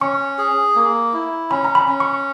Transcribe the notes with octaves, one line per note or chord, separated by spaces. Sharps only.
C#4 C#6
G#4
A#3
E4
C#4 B5
A#5
B5
C#4
C#6